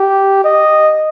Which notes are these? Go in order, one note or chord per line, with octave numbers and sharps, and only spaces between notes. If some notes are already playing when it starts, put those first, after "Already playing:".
Already playing: G4
D#5